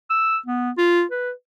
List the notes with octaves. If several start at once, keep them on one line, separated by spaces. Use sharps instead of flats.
E6
B3
F4
B4